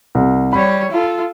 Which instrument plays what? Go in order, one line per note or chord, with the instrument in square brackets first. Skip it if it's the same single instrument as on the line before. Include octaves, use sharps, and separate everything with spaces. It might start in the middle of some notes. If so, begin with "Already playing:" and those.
[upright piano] C2
[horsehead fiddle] G3 C#5 [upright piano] B5
[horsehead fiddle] F4 A4